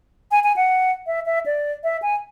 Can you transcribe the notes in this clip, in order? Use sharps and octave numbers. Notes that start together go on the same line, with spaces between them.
G#5
G#5
F#5
E5
E5
D5
E5
G#5